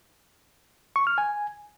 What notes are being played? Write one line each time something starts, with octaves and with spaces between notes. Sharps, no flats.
C#6
F6
G#5